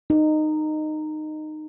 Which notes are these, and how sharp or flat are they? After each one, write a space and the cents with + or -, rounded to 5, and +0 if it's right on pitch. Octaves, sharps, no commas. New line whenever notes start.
D#4 -15